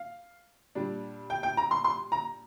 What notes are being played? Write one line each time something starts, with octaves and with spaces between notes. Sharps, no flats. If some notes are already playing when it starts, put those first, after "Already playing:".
Already playing: F5
A#2 G3 D4
G5
G5
A#5
C6
C6
A#5